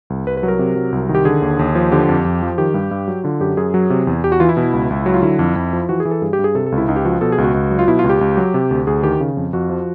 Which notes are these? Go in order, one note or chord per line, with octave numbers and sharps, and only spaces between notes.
C2
C2 B4
B4
F#3
A#4
C3
F#3
C2
D#3
G4
D3 G#4
D#2
D#2
F3
D3 G4
F2
F2
F3
D#3 G4
G2
G2
F#3
D3 F4
F#2 G4
F#2 G#4
F#3
C3
E2
E2 G4
F#4
E3 F4
E4
B2
C#2
C#2
F#3
F4
D3 E4
F2
F2
F3
E3 F#4
G#4
E3
A4
G2 G#4
G4
G2
G#4
C3 A4
A4
C#2
E4
C#2 D#4
G4
F3 F#4
B2 A4
G#4
C#2
F#4
C#2
F#3
F4
B2 E4
F4
C#2
G4
C#2
F#3
C3
D2
D2 G#4
D#3 G4
C#3
F2
F2 F#4
F3